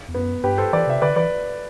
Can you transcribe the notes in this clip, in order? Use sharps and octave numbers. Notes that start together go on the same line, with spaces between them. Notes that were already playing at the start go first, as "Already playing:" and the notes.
E2
F#2 B3
G2 G4 B4
A4 C5
E3 B4 D5
C3 E5
D3 B4 D5
E3 B4 D5